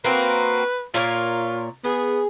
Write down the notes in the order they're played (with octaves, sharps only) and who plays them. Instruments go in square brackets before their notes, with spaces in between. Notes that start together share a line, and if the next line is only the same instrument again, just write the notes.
[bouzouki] A#3 C4 F#4 [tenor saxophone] B4
[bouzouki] A#2 A#4 C#5 [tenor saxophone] F4
[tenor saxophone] B3 [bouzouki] G#4